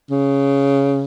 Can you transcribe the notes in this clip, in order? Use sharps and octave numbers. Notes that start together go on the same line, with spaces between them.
C#3